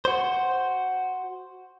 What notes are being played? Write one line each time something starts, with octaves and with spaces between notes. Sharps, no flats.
F#4 C5